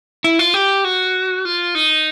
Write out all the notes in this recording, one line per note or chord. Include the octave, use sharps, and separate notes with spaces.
E4
F4
G4
F#4
F4
D#4